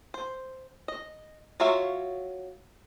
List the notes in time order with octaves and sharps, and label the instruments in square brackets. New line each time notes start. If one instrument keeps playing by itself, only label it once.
[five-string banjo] C5
D#5
F#3 F4 C#5 E5 F5